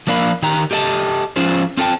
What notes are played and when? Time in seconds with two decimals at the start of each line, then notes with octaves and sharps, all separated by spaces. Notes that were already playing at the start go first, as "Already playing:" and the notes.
0.07 F3 A#3 D4 F5 B5
0.42 D#3 G4 A#5
0.71 G4 A4 D#5 G5 A5
1.36 F3 C#4 F4 G#4 C5
1.77 C4 F4 A4 C5 G5 A5